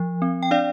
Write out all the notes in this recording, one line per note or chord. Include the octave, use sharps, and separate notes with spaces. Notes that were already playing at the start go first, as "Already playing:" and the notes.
Already playing: F3
C4
G5
D4 D5 F5